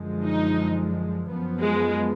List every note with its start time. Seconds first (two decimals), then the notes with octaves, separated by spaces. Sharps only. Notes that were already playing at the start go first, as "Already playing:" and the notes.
Already playing: F#2 D3 F3 G#3
0.24 D#4
1.27 F#2 F3 B3
1.62 G#3